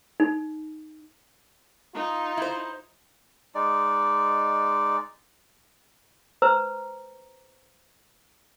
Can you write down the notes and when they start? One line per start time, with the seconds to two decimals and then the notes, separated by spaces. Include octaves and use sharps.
0.20 D#4
1.94 D#4 F4
2.37 E4 C5
3.55 G#3 D#4 D5
6.42 B4 C5 A#5 E6